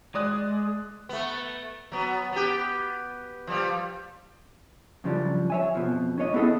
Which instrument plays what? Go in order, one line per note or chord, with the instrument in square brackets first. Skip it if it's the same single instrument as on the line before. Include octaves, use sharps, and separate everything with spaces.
[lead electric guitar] G#3 [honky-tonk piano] D5 D#6 F#6
[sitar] A3 B3
F#3 B3
B3 G4
F3 G3
[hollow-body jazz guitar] F#2 C#3 F3 G3 D4
C#5 E5 G#5
F2 B2 F3
C#4 D4 C#5 D#5
B3 E4 G#4 A4 D#5